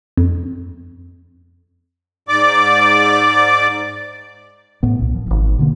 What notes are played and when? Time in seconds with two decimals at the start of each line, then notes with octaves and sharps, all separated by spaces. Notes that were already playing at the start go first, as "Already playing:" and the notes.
0.17 F2
2.28 G#2 D5 D6
4.83 A2 B3
4.99 C2 A#2
5.15 F3
5.26 D1 G#1
5.59 B2 D3 A#3